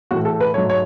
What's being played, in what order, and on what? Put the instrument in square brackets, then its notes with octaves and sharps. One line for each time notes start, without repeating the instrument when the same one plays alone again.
[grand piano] A2 E3 A3 F#4
A4
B4
G#2 F#3 A3 C#5
C#5